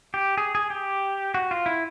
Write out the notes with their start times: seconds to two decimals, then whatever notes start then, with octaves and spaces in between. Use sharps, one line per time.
0.14 G4
0.37 G#4
0.55 G#4
0.70 G4
1.34 F#4
1.51 F4
1.66 E4